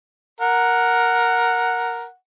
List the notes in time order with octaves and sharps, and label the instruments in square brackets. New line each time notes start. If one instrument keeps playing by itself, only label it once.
[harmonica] A#4 [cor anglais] F#5